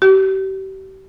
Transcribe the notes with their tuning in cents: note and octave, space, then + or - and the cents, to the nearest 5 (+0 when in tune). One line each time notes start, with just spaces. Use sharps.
G4 -35